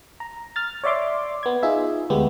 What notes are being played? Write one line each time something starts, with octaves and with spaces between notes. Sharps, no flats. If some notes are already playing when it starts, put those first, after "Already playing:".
A#5
F6 A6
C#5 D5 E5 C6 D6
B3 G#6
D#4 F4 G#4 E5
D2 G#3 B3 G4